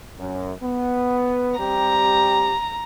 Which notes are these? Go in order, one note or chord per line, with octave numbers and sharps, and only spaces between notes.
F#2
B3
G3 C4 G4 A#5